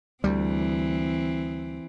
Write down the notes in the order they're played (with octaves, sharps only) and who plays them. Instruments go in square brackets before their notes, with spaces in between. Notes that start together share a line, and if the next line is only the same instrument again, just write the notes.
[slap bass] D2 G3 [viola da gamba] E3 C4